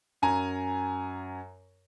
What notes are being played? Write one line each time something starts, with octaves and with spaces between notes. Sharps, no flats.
F#2 G#5 A#5